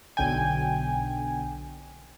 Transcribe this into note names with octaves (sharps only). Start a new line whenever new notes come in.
B1 D3 G5 G#5